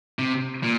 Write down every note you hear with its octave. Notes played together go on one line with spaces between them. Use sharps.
C3
A#2